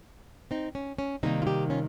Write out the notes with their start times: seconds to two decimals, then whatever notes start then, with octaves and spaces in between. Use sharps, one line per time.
0.51 C4 D#4
0.75 C#4
0.98 C#4
1.23 C3 D#3 G3 A#3 C4 D#4
1.42 F4
1.47 D#4 G4
1.70 C#4 F4